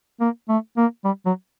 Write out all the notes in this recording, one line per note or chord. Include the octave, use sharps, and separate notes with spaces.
A#3
A3
A#3
G3
F#3